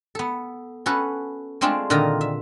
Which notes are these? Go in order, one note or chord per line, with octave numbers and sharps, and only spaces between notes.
B3 A4
C#4 F#4 A4 B4
G#3 A3 C4 D4 F4 G#4
A#2 D3 D#3 F4 D#5 A#5
E5